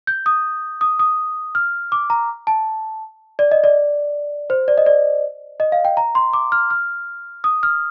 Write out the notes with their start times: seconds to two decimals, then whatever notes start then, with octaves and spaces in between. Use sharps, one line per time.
0.07 G6
0.26 D#6
0.81 D#6
0.99 D#6
1.55 F6
1.92 D6
2.10 A#5
2.47 A5
3.39 D5
3.51 D#5
3.64 D5
4.50 C5
4.68 D5
4.78 D#5
4.86 D5
5.60 D#5
5.72 F5
5.85 G5
5.97 A#5
6.15 C6
6.33 D6
6.52 F6
6.70 F6
7.44 D#6
7.63 F6